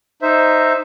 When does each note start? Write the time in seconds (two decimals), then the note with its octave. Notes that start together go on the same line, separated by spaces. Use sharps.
0.22 D#4 C5 E5